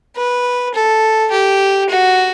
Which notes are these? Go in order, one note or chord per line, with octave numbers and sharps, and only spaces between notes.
B4
A4
G4
F#4